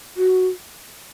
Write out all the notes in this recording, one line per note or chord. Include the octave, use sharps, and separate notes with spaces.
F#4